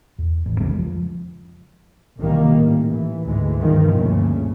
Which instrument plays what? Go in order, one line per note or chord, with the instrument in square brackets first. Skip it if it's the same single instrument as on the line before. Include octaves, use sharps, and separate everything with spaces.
[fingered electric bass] E2
A1 E3
C2 F2 C#3 G#3
F3
[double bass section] C2 A#2 D#3 G3 A#3
A1
E3
D2 G#2 E3 G#3
G2 B2 D#3 F3
G1 D2 A#2 C#3